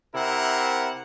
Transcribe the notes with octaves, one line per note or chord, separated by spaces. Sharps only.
C3 E4 A#4 F#5